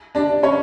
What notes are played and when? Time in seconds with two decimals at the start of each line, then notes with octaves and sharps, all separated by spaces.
0.15 D4 D5
0.43 C#4 C#5